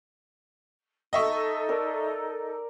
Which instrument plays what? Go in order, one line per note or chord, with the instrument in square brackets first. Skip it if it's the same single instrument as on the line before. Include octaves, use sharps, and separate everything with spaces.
[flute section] D#4 A4 [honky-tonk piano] D#5 E5 C#6
[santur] A#4 D5